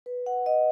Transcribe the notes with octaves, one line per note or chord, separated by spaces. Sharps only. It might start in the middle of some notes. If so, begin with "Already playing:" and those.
B4
F#5
D#5